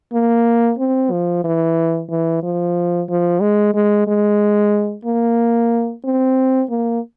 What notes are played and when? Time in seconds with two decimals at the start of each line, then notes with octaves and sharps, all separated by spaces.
0.13 A#3
0.79 C4
1.11 F3
1.44 E3
2.10 E3
2.43 F3
3.09 F3
3.41 G#3
3.74 G#3
4.08 G#3
5.05 A#3
6.05 C4
6.70 A#3